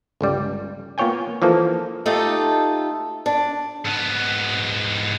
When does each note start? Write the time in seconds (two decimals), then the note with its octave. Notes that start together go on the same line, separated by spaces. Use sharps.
0.21 G1 C#2 G3
0.98 A#3 B3 F4 C#5 G5 G#5
1.42 E3 F3 A#3 A4
2.06 A3 D#4 F4 G4 A4 D#5
3.26 D4
3.85 G#2 B3